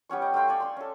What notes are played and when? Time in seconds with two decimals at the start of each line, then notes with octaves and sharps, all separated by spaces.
0.09 G3 B3 C#4 C#6
0.22 D#5 G5
0.34 A3 F5 G5 C6
0.47 D5 G#5 C#6
0.60 D5 C6
0.77 C#4 A4